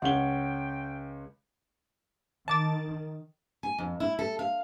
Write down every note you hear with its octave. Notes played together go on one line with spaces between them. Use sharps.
C#2 C#4 F#5 G5 G7
D#3 A5 D6 A6
G#5
F2
E4
A4
F5